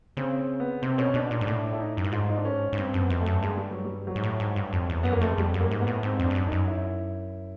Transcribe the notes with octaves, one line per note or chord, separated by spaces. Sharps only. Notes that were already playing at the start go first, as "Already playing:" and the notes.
C#3 C4
C4
B3
C3 C4
B2 C#4
B2 D4
A#2 D4
G#2
A2 D4
E4
D#4
F#2
G2
G#2 F4
D#4
D4
C#4
G#2
G2 C4
F#2
B3
F2
A3
F#2
G2 G#3
G3
F#3
G3
F#3
G#2
A2
G#2
G2
F2
E2
F#2 B3
A#3
F2 A3
G#3
F2 G3
F#2
A#3
G#2
B3
A2
G#2 C4
F2
D4
G2
F#2
D#4
F#2
E4